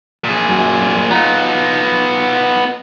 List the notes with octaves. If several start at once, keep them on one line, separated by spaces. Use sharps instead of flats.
A#2 G#4
F#2
B3 D#4 F4 A#5